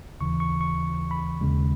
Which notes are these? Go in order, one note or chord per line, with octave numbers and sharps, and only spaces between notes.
D#2 C#3 E3 C#6
C#6
C#6
B5
D#2 C#3 G#3